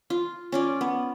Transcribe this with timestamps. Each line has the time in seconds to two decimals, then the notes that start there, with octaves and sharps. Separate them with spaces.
0.10 F4
0.52 C#4 F4 D5
0.81 B3